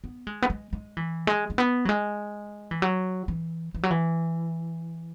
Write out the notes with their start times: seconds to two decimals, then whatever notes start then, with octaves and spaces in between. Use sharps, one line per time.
0.04 B3
0.27 G#3
0.42 B3
0.50 G#3
0.73 G#3
0.97 E3
1.27 G#3
1.50 G#3
1.58 B3
1.85 F#3
1.89 G#3
2.71 E3
2.82 F#3
3.28 E3
3.75 E3
3.83 F#3
3.91 E3